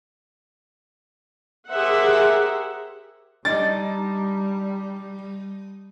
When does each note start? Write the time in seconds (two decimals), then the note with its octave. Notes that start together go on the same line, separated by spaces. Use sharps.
1.70 G4 G#4 A#4 C5 E5 F#5
3.45 G3 D4 D#4 A6